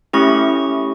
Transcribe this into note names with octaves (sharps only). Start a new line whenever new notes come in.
A3 C#4 E4 G4 C#6